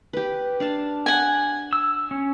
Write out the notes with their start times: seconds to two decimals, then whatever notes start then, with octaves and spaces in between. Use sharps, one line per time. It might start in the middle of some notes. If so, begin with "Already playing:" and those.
0.13 G4 B4
0.60 D4 F5 A5
1.06 F#5 G#5
1.73 E6
2.11 C#4